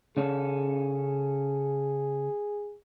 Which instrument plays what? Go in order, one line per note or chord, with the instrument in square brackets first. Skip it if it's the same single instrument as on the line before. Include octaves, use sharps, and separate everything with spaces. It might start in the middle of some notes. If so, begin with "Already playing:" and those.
[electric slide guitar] C#3 C#4 A4 [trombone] G#4